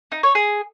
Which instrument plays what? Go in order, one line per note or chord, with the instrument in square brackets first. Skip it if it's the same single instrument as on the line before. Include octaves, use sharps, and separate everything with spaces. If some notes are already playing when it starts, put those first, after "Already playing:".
[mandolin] D#4
C#5
G#4